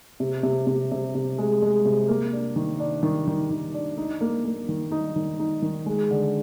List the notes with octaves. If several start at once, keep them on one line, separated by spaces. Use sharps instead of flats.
C3
C3
C3
C3
C3
G#3
G#3
C3
A#3
D4
D#3
D4
D#3
D#3
D#3
D4
D#4
A#3
A#3
D#3
D#4
D#3
D#4
D#3
G#3
D3